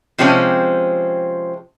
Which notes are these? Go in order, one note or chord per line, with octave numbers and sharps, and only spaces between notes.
C3 F3 G#3 C4 C#4